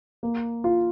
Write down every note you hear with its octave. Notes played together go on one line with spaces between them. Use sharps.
A#3
F4